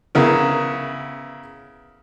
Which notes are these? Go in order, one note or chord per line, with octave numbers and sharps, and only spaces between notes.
C#3 B3 E4 A#4